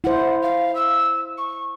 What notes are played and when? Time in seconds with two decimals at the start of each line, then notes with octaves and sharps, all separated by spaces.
0.04 E4 C5 F#5
0.42 F5
0.75 E6
1.37 C#6